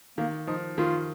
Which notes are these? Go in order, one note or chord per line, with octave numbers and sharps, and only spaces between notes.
D#3 A#3
F3 D#4
D#3 F4